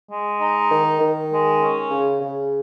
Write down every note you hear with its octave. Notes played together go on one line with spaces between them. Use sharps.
G#3
D#4
D#3
D#3
G#3
C#4
C#3
C#3